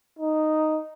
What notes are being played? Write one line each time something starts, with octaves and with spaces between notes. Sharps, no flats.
D#4